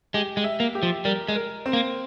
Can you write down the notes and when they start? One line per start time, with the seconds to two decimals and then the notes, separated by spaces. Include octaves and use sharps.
0.14 G#3 G4
0.37 G#3
0.44 E5
0.60 A#3
0.75 G4
0.83 F3
1.05 G3 A#4
1.28 G#3
1.36 A#4
1.66 C4
1.73 A#3